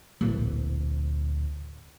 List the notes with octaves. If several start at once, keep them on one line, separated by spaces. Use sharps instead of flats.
D1 A#1